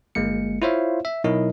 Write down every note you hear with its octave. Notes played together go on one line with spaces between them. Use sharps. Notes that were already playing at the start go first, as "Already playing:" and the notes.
G1 G#3 A#3 C#7
E4 F4 C5 C#5 E5 F5
E5
B2 F#3 D#4 E4 A#4 D#5